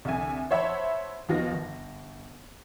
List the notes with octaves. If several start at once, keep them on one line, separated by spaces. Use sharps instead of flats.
C2 D3 E5 G#5
C5 C#5 E5 F#5 A5 B5
D#2 D#3 F3 B3 D#4 A#6
G1